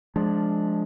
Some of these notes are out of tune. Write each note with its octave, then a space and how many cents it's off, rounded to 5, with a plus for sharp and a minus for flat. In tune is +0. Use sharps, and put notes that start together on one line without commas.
F3 +0 G#3 +15 D4 +0